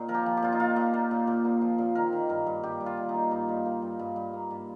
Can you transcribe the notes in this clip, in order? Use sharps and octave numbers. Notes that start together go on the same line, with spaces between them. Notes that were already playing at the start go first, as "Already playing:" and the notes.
Already playing: A#2 A#3 C4 D#4
F3 A#4
G4
F3
G4
A#2 F4
D#4
A#2 F4
A#2
A#3
A#2
A#2
A#3
F3
A#2
D#3 A#4
D#3
G2 A#4
G2
G2 G4
G2
F4
D#3
D#4
A#3
G2 D#4
G2
A#3
G2
G2
G2
A#3
G2